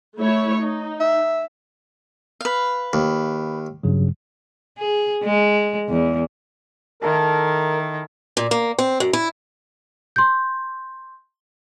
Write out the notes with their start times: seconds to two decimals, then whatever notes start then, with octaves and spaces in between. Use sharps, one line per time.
0.20 A3 E4 C#5
0.61 D#4
1.00 E5
2.41 B4 F5
2.93 D#2
3.83 G2 C#3 F#3
4.78 G#4
5.24 G#3
5.89 E2
7.02 D#3 E4 A4 A#4
8.37 A#2
8.51 A#3
8.79 C4
9.00 F#2
9.13 E4
10.16 C6 G6